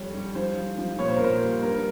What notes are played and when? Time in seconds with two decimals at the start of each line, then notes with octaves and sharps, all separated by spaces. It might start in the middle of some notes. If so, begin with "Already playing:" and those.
Already playing: F2 G3 C#5
0.14 G3
0.35 F3 C5
0.57 F3
0.78 F3
0.99 A#2 C#5
1.08 C5
1.16 A#4
1.20 A#2 C5
1.42 G3
1.63 G2 A#4